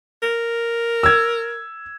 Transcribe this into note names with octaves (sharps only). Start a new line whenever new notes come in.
A#4
E6 G#6